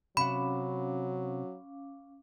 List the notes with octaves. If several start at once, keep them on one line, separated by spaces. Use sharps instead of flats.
C3 F#3 C#4 F5 F#5 B5 D6